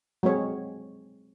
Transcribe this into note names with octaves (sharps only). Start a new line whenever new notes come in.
F#3 G#3 C4 C#5